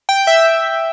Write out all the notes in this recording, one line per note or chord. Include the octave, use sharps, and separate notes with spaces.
G5
E5